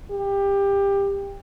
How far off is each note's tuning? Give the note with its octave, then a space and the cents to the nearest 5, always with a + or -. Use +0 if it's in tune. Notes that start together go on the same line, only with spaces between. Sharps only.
G4 +20